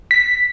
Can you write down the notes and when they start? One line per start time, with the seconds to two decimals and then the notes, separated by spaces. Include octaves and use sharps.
0.11 B6